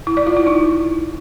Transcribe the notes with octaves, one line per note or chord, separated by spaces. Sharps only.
E4
D5
F4
E4
D#4